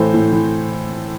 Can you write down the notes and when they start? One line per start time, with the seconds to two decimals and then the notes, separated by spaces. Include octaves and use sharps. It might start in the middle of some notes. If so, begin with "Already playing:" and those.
Already playing: A2 E3 A4 C5
0.14 A2
0.32 E3